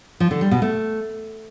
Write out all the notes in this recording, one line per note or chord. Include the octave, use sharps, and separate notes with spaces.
F3
D3
G3
B2
A3